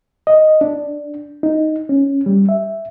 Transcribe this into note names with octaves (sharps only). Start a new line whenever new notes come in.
D#5
D4
D#4
C#4
G3
E5